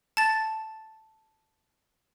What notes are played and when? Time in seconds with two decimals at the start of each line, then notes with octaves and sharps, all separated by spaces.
0.17 A5 A6